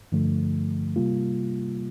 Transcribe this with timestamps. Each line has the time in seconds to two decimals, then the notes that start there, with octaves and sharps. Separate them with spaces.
0.12 G2 D3 F3 A3
0.96 C3 G3 A#3 F4